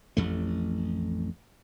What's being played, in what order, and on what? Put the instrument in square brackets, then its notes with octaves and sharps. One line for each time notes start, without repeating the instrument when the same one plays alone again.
[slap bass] A1 F2 A3